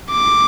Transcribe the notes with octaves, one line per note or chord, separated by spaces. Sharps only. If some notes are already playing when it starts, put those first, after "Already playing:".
D6